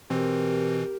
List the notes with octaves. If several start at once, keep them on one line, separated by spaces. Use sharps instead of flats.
B2 E3 C4 G4 A#4